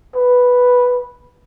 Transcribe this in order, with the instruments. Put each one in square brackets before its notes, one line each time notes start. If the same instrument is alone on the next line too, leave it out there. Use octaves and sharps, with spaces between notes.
[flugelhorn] B4